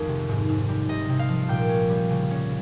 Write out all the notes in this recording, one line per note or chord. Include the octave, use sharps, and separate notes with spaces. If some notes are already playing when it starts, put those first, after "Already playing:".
Already playing: F2 G#2 D#3 G#3
C3
G#2
G#2
G3
C3 D#5
C3
F5
F3
A#2 G5
C#4
G3
C#3
C#4